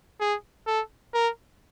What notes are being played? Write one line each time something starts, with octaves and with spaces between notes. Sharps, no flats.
G#4
A4
A#4